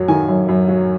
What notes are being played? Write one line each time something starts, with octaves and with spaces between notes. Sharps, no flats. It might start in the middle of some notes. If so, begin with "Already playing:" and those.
Already playing: F#2 F#3
D#3 G#5
F#2
F#2
F#3